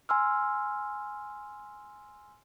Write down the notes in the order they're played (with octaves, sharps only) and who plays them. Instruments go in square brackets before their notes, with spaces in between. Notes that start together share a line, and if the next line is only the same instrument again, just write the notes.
[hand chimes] G#5 C6 E6 F6